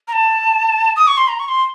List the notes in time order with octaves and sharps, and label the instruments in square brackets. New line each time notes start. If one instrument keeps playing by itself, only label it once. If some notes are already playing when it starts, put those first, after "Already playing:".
[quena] A#5
A5
D#6
C#6
C6
A#5
C#6
C6